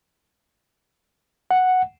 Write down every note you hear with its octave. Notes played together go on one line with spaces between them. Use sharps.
F#5